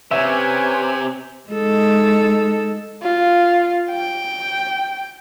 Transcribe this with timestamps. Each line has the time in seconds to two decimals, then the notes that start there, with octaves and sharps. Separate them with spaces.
0.11 C3 C#4 B4 C#5 E5 G5 G#5
1.50 G#3 D#4 A4
3.03 F4
3.91 G5